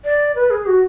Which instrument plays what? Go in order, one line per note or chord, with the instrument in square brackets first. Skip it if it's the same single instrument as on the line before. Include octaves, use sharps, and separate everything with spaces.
[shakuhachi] D5
B4
G#4
F#4